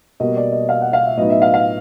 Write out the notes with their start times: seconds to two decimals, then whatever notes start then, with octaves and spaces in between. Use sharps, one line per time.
0.20 B2 G3 A#3 D#5
0.37 D5
0.52 D#5
0.69 F5
0.81 F#5
0.93 F5
1.05 E5
1.17 A2 F#3 B3 D#4 D#5
1.30 E5
1.42 F5
1.54 F5